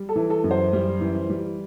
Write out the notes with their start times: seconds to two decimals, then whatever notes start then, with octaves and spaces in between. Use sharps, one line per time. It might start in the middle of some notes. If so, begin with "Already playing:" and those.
Already playing: G3
0.09 A4
0.16 E3
0.30 A4
0.44 F#2
0.51 C5
0.73 G3
1.01 E3
1.29 G3